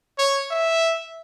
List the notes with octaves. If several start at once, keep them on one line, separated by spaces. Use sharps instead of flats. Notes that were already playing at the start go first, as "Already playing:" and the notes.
C#5
E5